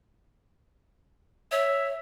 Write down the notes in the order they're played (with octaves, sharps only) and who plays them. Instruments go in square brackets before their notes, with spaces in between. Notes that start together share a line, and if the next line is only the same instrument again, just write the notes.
[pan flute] C#5 [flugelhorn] E5